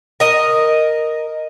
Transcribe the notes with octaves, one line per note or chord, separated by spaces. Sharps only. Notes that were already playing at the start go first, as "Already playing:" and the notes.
A#4 D#5